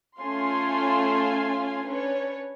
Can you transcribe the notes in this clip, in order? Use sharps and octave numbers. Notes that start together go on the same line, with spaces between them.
A3 C#4 F4 F5 G#5 C6
C#4 D4 B4 C#5